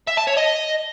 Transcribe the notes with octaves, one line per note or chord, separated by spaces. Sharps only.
E5
A5
C#5
D#5